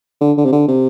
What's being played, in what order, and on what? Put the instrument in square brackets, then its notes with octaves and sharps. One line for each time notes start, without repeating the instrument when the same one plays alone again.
[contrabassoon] D3
D3
C3
D3
C3